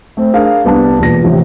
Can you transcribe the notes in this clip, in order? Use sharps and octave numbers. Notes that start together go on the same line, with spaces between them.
A3 C4
D4 G#4 A#4 F5
C2 B3 D4 A5
E1 A#2 B4 A#6
A1 C3 F3